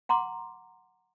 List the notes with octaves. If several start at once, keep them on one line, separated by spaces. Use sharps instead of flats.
F#5 A#5 C6 D6